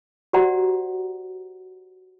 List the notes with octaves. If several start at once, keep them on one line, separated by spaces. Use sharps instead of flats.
F#4 G4 C5 D5 F#5 A#5